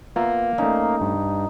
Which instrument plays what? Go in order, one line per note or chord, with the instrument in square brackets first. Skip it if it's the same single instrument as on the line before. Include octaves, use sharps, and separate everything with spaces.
[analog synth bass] A#3 [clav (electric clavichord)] B3 F4 E5 [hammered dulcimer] A#5
[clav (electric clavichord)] A3 C#4 [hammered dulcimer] D#4
[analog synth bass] G2